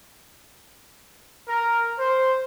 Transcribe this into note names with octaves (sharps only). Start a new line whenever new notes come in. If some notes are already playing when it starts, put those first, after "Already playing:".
A#4
C5